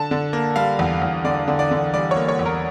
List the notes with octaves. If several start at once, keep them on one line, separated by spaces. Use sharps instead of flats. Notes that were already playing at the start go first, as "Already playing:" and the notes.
Already playing: D3 A5
D3
A#3
G3 F5
E2
E2
D3 D5
D3
D5
D3
G3 D5
A#3 C#5
C#5
E2
A#4